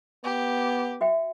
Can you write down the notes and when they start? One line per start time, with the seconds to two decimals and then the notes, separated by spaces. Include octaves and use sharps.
0.24 B3 G4
1.01 F#4 E5 G5